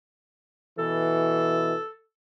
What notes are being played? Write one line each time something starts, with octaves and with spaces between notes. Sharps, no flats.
B2 E3 A4